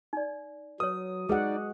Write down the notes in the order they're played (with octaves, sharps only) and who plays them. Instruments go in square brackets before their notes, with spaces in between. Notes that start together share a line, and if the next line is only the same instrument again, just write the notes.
[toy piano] D#4 D5
[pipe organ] F#3 [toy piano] B4 C#5 [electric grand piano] D#6
[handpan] G#3 F#4 F#5 [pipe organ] D#4 D5 [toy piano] G#4 B4